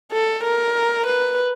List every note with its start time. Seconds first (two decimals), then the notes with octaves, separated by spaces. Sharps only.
0.13 A4
0.44 A#4
1.07 B4